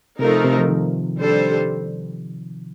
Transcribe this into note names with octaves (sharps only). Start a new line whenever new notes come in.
C3 F3 A3 D#4 A#4
C3
F3
D#3
G3 D4 A4 C5